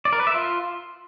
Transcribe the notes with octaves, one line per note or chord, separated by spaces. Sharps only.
D5
A#4
B4
E5
F4